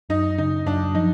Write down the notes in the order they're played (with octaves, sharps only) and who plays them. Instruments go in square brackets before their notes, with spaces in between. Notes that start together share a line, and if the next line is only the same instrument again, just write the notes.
[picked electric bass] F#2 [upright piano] D#4
[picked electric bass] C#3 [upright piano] D#4
[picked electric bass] F#2 [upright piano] D4
[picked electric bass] F3 [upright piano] D#4